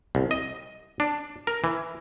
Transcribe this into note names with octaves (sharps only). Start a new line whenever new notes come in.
C2
D#5
D4
A#4
E3